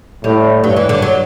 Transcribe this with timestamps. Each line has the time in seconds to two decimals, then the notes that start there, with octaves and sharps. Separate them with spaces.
0.24 A2 G3
0.63 G2 F#3
0.77 E3
0.89 D3
1.02 F#3